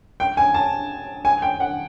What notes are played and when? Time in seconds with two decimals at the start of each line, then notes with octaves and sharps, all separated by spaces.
0.20 G5
0.37 G#5
0.54 A5
1.25 G#5
1.42 G5
1.60 F#5